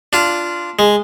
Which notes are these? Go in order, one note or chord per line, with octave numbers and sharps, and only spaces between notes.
D4 F4
G#3